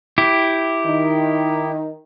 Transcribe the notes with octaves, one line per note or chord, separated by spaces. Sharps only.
E4 G4
D#3 D#4